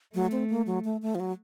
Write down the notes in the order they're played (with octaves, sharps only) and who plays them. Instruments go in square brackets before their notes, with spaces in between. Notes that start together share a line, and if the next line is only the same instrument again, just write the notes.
[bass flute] F#3 [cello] A3
[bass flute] C4
A#3
F#3
A3
A3
F3
F#3